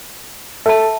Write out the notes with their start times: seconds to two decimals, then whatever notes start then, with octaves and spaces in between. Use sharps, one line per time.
0.66 A4 E5 A5